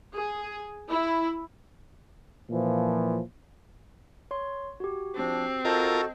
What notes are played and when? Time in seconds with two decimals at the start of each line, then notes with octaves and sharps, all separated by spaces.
0.14 G#4
0.89 E4
2.50 A#2 E3 F3
4.31 C#5 C6
4.80 F#4 G4
5.16 F3 C4 D4
5.65 F4 F#4 A4 A#4 D#5 A5 G6